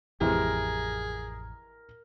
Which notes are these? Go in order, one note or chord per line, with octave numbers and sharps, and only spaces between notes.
A1 F2 C3 E3 G#3 G#4 A#4